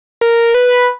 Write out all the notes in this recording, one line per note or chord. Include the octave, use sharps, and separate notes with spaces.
A#4
B4